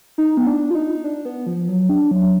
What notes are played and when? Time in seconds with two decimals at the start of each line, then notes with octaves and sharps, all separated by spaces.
0.18 D#4
0.37 B3
0.47 D4
0.71 F4
0.75 D#4
1.04 D4
1.25 B3
1.46 F3
1.69 F#3
1.89 D4
2.11 F#3